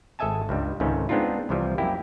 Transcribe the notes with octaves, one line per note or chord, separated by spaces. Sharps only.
G#1 A4 D#5 E5 G#5 A5
C#2 G2 G3
C#2 G#2 C3 D#3 A3 C#4
G#3 B3 C4 D4 D#4 F4
C2 C3 E3 F3 G3
F#2 A#3 E4 G4 G5